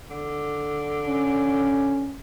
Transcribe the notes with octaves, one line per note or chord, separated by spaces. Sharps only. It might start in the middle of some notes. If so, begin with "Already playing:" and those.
D3
C#4